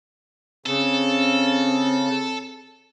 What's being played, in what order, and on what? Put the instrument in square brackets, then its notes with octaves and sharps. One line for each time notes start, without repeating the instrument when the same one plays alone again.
[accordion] C#3 [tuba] C4 [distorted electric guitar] A4